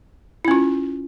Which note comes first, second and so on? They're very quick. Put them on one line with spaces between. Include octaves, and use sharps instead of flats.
E4 C#4 F4